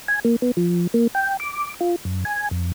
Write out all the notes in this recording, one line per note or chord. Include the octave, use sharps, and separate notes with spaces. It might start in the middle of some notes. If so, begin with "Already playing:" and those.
G#5
A#3
B3
F3
A#3
G5
D6
F4
F#2
G#5
F2